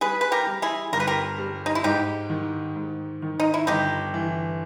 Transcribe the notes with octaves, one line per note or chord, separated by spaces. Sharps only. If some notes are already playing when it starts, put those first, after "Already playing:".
G3 G#4 B4
B4
G4 A#4
G3
E4 G#4
G1 A#4
B4
G4 A#4
G3
D#4
E4
G#2 D#4 G4
D#3
G#2
D#3
D#4
E4
G1 D#4 G4
E3